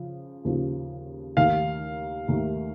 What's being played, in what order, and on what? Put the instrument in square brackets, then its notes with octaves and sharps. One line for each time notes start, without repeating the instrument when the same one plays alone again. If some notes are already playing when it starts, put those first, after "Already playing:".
Already playing: [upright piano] C#3 F3
D#2 C#3 F3
[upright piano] D#2 D#3 A3 [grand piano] F5
[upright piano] D#2 D#3 A3